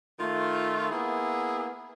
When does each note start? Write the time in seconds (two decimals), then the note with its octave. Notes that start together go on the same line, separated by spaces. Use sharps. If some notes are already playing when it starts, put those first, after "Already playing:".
0.19 D#3 A3 F4
0.91 A#3 B3 E4 G#4